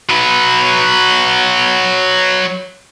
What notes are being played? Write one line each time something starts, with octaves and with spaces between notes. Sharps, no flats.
F#3 B4